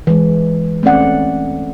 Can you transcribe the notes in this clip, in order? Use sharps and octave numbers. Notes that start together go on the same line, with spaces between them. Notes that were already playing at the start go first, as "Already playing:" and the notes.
E3 G#3
A3 C4 C#4 D5 F#5